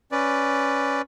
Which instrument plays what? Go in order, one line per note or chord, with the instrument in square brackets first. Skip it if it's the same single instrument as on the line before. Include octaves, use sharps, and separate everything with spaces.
[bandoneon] C#4 B4 D5